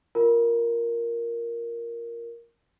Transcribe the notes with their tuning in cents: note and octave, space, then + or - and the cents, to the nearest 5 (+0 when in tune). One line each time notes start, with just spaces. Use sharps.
F4 +0 A#4 +0